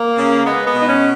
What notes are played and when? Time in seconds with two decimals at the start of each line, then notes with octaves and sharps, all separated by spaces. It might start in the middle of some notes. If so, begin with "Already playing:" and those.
Already playing: A#3
0.17 C#3
0.45 G#3 B3
0.66 B3
0.74 B2
0.80 D#4
0.88 C#4